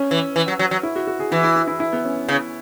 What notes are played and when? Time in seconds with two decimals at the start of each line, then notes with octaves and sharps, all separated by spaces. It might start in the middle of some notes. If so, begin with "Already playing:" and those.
Already playing: C#4
0.11 E3
0.36 E3
0.48 F#3
0.59 F#3
0.71 F#3
0.83 E4
0.96 F#4
1.07 F#4
1.20 G#4
1.32 E3 E4
1.44 E4
1.56 E4
1.68 E4
1.80 E4
1.93 B3
2.05 C#4
2.29 C#3